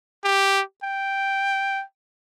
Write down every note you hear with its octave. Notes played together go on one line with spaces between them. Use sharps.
G4
G5